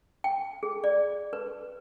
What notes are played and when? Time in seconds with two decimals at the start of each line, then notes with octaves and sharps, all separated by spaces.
0.24 G5
0.63 G#4
0.84 D5
1.33 B4